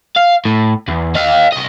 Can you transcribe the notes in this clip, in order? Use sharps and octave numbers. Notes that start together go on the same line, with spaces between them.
F5
A2
E2
D#5 F5
C2 D#5